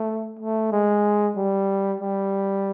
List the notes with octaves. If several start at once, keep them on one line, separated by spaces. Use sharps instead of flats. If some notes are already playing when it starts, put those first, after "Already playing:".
Already playing: A3
A3
G#3
G3
G3